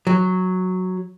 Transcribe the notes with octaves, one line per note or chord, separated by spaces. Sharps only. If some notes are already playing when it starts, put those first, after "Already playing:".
F#3